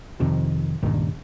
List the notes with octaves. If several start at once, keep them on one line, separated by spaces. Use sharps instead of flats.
F2 C3 D#3
C#2 G2 A#2 D#3